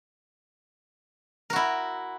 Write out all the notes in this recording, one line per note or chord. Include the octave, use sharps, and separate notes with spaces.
E4 F#4 A#4